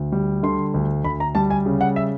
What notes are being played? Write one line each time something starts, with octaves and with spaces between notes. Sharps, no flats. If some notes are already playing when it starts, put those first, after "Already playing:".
Already playing: D2
G3
D3 C6
D2
D2 B5
A#5
G3 A5
G#5
C#3
F#5
E5